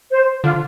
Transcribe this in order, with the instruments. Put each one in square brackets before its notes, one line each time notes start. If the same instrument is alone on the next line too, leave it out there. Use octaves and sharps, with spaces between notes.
[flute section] C5
[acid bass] D3 [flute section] F4